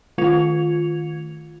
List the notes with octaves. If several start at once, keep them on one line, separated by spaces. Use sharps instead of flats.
D#3 A3 F4 G#6 C#7 F7